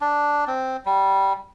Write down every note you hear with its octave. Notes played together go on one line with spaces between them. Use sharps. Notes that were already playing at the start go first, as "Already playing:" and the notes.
D4
C4
G3